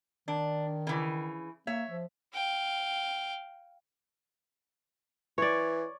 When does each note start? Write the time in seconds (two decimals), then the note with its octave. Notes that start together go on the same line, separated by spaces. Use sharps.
0.28 D#3 D4
0.87 C#3 E3
1.67 A#3 C#5 E5
1.90 F3
2.34 F5 G5
5.38 E3 C#5 D5